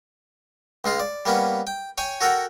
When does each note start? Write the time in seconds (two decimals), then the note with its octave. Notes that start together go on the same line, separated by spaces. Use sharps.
0.84 C#2 G#3 F4 C6
1.00 D5
1.26 G3 A#3 B3 C#4
1.67 G5
1.98 C#5 G5 G#5
2.21 F#4 A4 A#4 F#5 G5